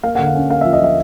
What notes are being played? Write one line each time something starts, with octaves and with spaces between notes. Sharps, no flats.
A#3 F5
F#5
D3
F5
C#4
A#3 F5
F3 E5
D#5
F3 E5